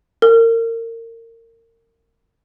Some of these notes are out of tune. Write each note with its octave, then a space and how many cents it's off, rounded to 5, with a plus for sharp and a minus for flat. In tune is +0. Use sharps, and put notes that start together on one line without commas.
A#4 -30